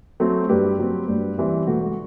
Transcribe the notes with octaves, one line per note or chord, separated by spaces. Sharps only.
F#3 A3 C4
G2 G4 B4
F#3 C4
G2
E3 G3 C4
E1 F#4 A4